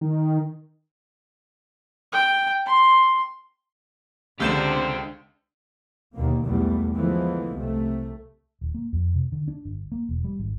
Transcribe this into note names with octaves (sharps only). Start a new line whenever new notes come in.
D#3
G5
C6
C#2 D3 G4 C5 G6 E7
D#2 B2 D3 D#3 A#3
B1 E2 A#2 G3 A3
D3 E3 F3 G#3 A3 B3
C2 C3 A3
D#1
A#3
F2
C3
D3
D4
G1
A#3
E1
G3
G#1